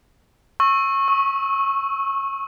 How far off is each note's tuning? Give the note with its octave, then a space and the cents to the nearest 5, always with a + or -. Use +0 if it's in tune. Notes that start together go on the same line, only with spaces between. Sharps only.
C#6 -20 E6 +0
C#6 +0 E6 -40